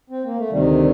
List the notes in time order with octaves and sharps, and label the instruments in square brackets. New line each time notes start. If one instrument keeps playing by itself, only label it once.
[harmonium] C4
A#3
A3
D2 C3 D#3 G3
G3